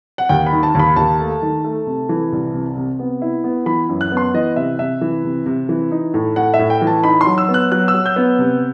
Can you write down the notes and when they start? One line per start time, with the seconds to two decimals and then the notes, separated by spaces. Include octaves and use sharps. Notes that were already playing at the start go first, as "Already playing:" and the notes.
0.18 F#5
0.29 D#2 G5
0.46 B5
0.52 D#3
0.63 A5
0.75 D#2 B5
0.96 D#2 A5
1.19 A3
1.42 D#3
1.64 A3
1.87 C3
2.09 E3
2.32 C2
2.55 C3
2.77 C3
2.99 B3
3.22 E4
3.44 B3
3.66 E3 B5
3.89 F#2
4.01 F#6
4.12 B3
4.17 C6
4.34 E3 D#5
4.56 C3 E5
4.79 C3 E5
5.01 E3
5.24 C3
5.46 C3
5.69 E3
5.92 D#4
6.14 A2
6.36 A2 F#5
6.54 E5
6.59 A2
6.70 G5
6.82 E3
6.87 A5
7.04 D#4 B5
7.21 C6
7.26 F#3
7.38 E6
7.48 B3
7.54 F#6
7.72 F#3 F#6
7.88 E6
7.94 F#3
8.06 G6
8.16 B3
8.39 C3